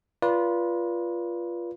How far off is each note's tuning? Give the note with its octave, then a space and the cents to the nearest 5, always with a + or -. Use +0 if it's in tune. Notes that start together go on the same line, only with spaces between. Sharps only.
F4 -15 B4 -30 D5 -20